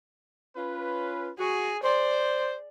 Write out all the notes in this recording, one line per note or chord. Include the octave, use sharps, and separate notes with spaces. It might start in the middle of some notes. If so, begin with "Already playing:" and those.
C#4 F4 B4
F#4 G#4
C5 D5